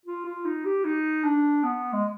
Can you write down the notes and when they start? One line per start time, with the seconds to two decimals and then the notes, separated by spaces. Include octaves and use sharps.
0.06 F4
0.25 F4
0.45 D#4
0.65 G4
0.85 D#4
1.24 D4
1.63 B3
1.93 G#3